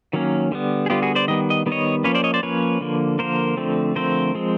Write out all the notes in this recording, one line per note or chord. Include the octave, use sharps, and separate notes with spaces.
D#3 F#3 A#3 C#4
D3 G3 B3
G#4
D3 G3 B3 F4 G4
F#4 G#4
C5 D5
D#3 G3 B3 D#5
D#5
D#3 G3 B3
C#5 D#5
F3 A#3 C#4 B4 C#5
C5 D5
C#5 D#5
C5 D5
F3 A#3 C#4 B4 C#5
D3 F3 A#3
D3 F3 A#3 A#4 C5
D3 F3 A3 C4
D3 F3 A3 C4 A#4 C5
F3 G#3 C4